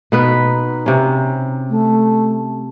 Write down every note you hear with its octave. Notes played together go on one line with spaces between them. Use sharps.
B2 B3 D#4 B4
C3 C#4
A3